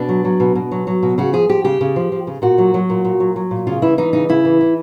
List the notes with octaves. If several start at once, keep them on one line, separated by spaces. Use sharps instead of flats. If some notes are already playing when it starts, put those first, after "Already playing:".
Already playing: B2 D4
F#3
F#3
B2
B2
F#3
F#3
B2
C#3 F#4
F3 G#4
F3 G4
C#3 G4
C#3
F3
F3
C#3
A#2 F#4
F#3
F#3
A#2
A#2
F#3
F#3
A#2
C#3 F4
E3 E4
E3 D#4
C#3 D#4
C#3 E4
E3
E3